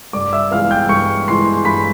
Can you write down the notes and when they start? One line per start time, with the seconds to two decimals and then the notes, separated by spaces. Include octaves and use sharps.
0.13 G2 D5 D6
0.33 E5 E6
0.51 E3 G#3 B3 F5 F6
0.70 G5 G6
0.89 G2 C#6 C#7
1.28 E3 G#3 B3 C6 C7
1.65 G2 B5 B6